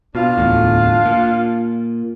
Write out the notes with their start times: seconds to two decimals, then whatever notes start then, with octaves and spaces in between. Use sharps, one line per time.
0.15 B2 D4 F4
0.38 D1 E2 A2
1.06 A#2